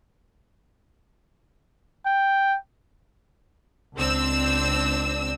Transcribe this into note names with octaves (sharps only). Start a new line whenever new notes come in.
G5
C#2 C4 D4 E6